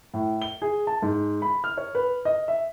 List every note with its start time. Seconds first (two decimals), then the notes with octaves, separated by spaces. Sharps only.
0.14 A2
0.42 G7
0.62 G#4
0.87 A5
1.02 G#2
1.42 B5
1.64 F6
1.77 C#5
1.95 B4
2.25 D#5
2.48 E5